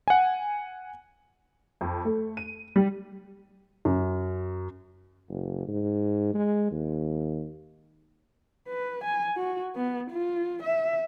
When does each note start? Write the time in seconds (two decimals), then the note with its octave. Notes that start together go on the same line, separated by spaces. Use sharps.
0.08 F#5 G#5
1.81 F2
2.05 A3
2.37 D#7
2.76 G3
3.85 F#2
5.29 F#1
5.68 G#2
6.34 G#3
6.71 D#2
8.69 B4
9.04 G#5
9.37 F#4
9.76 B3
10.11 F4
10.63 E5